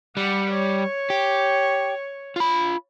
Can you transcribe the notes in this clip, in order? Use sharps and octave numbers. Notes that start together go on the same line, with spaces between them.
G3 F#5
C#5
G4
F4 B5